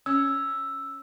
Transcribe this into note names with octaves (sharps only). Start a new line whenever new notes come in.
C#4 E6